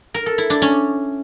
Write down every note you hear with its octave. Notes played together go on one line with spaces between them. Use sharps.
A#4
A4
E4
D4
C#4